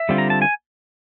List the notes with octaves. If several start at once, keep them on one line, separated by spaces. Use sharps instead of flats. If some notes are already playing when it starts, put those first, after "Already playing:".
Already playing: E5
D3 G3 C4 F4
A#5
A5
G#5